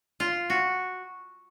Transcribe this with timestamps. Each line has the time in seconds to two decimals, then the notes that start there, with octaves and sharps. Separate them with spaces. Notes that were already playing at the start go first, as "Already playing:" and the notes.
0.20 F4
0.50 F#4